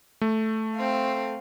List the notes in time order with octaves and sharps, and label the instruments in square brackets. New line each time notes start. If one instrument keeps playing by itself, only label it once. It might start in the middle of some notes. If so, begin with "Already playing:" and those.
[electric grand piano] A3
[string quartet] C4 F5